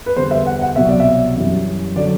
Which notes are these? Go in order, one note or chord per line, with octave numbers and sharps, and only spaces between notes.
B4
E2 D3 G3 C5
E5
F#5
F#5
C2 B2 F#3 E5
D5
E5
F#2 E3 G3
D3 F#3 D5